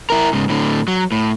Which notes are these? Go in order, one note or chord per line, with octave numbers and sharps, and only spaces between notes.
E4 A#4
G#2 C#3
A2 D3
F#3
A2